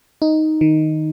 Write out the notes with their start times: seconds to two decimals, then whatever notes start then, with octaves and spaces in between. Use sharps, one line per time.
0.22 D#4
0.61 D#3